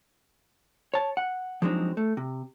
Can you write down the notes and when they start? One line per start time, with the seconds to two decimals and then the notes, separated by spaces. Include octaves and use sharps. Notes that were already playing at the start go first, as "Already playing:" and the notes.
0.94 C#5 A5
1.17 F#5
1.62 F3 F#3 G#3 C4 D4 D#4
1.97 A3
2.17 C3